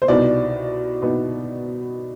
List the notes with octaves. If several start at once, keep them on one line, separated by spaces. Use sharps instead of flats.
C5
C2 B2 B3 D#4 D5
B2 B3 D#4